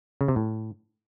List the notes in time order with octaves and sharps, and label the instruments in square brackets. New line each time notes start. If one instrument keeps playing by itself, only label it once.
[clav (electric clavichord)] C#3
C3
A2